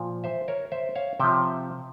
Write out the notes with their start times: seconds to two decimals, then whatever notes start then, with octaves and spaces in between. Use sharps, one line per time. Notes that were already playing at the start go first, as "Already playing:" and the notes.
Already playing: A#2 F3
0.24 C5 E5
0.48 A#4 C#5
0.72 C5 E5
0.96 C#5 F5
1.20 C3 F3 E5 G5